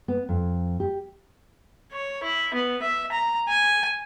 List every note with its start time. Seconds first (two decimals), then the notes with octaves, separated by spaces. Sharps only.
0.08 B3
0.29 F2
0.80 G4
1.92 C#5
2.23 E4
2.54 B3
2.82 E5
3.12 A#5
3.49 G#5